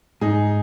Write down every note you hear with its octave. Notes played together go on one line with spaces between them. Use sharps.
G#2 D#4 G#4